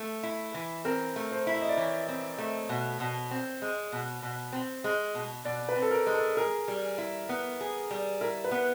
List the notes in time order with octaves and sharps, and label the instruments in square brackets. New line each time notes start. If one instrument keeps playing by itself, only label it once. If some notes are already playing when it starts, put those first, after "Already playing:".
Already playing: [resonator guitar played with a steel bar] A3
E4
E3
[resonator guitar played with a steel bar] C4 [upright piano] A#4
[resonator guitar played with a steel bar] A3
[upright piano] C5
[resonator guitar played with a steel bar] E4
[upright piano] E5
D#5
D5
[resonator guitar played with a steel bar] E3 [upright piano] C#5
[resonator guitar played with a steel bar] C4
A3
B2
B2
C4
G#3
B2
B2
C4
G#3
B2
[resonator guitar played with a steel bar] B2 [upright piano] D5
[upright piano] B4
[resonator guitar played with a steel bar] C4
[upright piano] A4
A#4
[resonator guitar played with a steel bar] G#3
[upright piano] A4
[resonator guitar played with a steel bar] G#4 [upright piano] A#4
[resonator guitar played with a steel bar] G3
E4
B3
G#4
G3
[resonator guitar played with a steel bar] E4 [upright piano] A#4
[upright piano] B4
[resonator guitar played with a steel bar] B3